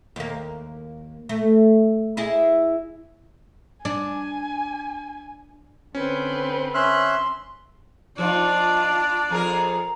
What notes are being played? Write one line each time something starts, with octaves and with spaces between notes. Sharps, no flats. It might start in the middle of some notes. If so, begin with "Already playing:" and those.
D#2 A#3
A3
E4 G#4 D#5
D4 G#5
D3 C4 C#4 B4
C#4 E5 C6 F6 F#6
F3 D4 D#4 F4 D5 A5
F2 G#4 A#4 A#5